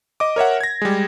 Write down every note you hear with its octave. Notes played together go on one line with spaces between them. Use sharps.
D#5 D6
A#4 C#5 E5 F#5
G#6 A#6
G3 G#3